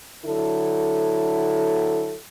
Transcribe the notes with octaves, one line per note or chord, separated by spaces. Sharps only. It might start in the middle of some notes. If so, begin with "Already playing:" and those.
D3 F#3 E4 A4